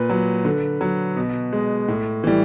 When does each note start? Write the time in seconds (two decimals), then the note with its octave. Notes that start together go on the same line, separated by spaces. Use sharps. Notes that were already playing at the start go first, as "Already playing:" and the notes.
Already playing: A#2 B4
0.10 F#3
0.45 D3
0.81 F#3
1.16 B2
1.53 G#3
1.88 A2
2.24 E3 G3